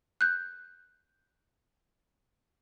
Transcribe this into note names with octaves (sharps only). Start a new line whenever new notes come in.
F#6 G6